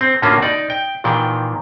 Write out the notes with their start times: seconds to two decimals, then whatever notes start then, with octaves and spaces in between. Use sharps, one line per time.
0.01 C4
0.22 A2 D3 A#3 C#4 F4 F#4
0.42 D#4 D5
0.70 G5
1.04 A#2 D#3 E3 G5